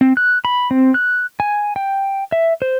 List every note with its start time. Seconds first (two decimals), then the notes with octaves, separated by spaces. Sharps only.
0.01 C4
0.17 F#6
0.45 B5
0.71 C4
0.94 F#6
1.40 G#5
1.76 G5
2.32 E5
2.62 C5